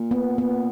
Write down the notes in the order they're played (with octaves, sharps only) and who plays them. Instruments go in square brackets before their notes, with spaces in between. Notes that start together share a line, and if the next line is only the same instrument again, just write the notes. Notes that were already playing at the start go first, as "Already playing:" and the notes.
Already playing: [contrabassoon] A#2
[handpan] B3
B3